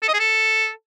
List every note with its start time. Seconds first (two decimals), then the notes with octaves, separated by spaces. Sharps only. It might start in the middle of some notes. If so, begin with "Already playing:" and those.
0.02 A4
0.08 D#5
0.14 G#4
0.20 A4